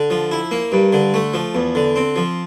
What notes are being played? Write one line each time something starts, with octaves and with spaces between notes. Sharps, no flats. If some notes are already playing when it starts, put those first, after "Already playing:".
Already playing: D3
F3
E4
A#3
G2
D3
A3
F3
E2
D3
C4
F3